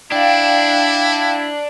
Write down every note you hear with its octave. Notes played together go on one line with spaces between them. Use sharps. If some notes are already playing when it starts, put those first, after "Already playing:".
D4 E4 F5 G5